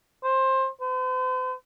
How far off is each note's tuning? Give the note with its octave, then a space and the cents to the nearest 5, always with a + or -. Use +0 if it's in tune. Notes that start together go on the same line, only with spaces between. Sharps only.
C5 +20
C5 -45